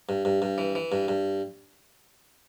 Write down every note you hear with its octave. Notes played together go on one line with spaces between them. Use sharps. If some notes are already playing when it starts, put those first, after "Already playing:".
G2
G2
G2
E3
E3
G2
G2